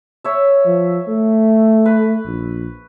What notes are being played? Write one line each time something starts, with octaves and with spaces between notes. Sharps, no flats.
C#5 E5
F3
A3
B4
A#1